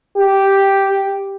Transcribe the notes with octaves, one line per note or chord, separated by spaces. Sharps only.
G4